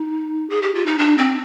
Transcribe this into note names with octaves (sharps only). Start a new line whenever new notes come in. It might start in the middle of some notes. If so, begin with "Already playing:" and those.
Already playing: D#4
G#4
G4
F4
D#4
D4
C4